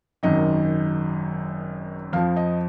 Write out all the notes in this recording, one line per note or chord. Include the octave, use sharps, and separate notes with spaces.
G#1 F#2 D#3 D#5
F2 F3 F5
D#5